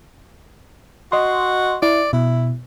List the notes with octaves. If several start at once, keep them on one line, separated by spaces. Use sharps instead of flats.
F#4 D#5 C6
E4 D5
B2 E4